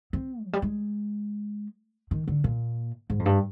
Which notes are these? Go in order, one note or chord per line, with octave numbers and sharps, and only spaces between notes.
C4
F3
G3
G#3
D#3
D3
A#2
G#2
F2
G2